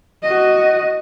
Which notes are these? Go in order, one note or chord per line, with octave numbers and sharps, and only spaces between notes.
F#4 D#5